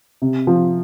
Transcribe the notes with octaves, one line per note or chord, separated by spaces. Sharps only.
C3
F3